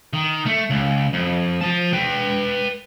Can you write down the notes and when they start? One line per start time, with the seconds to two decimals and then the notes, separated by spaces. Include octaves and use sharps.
0.13 D#3
0.46 A3
0.70 C#2
1.13 F2
1.61 F3 A5
1.93 B4 G5